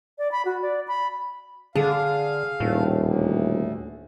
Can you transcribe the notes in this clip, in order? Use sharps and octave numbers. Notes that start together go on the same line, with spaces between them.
D5
B5
F#4
D5
B5
D3 G#4 F5
D#1 A2
D2